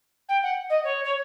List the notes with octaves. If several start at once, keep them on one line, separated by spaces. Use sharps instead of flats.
G5
F#5
D#5
C#5
C#5